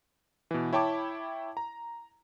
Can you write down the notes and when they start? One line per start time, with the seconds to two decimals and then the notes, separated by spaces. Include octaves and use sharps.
0.51 B2 E3
0.73 E4 C#5 G5 A5 B5 D6
1.57 A#5